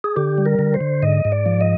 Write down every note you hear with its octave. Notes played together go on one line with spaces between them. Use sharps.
G#4
D3 G4
G3
A#4
D3
C5
D3
G#2 D#5
G#2
D5
F3
D#5